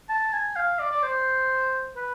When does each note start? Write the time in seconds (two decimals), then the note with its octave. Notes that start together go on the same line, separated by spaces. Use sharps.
0.09 A5
0.33 G#5
0.56 F5
0.79 D5
0.92 D5
1.03 C5
1.96 B4